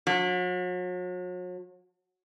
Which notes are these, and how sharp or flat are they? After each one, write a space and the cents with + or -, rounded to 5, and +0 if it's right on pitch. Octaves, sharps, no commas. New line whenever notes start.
F#3 -40